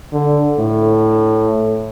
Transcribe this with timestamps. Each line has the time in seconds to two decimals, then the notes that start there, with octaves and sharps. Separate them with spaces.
0.13 D3
0.59 A2